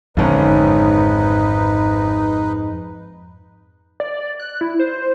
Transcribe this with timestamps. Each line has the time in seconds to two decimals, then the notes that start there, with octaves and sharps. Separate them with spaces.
0.17 G#1 F2 G#2 D3 C#4 D#4 B4
4.00 D5
4.40 F#6
4.61 E4
4.79 C5